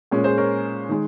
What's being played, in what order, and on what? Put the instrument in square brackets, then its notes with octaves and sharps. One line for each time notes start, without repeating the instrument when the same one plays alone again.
[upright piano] A#2 G#3 C#4
G#4 C5
A#4 C#5
D#3 G#3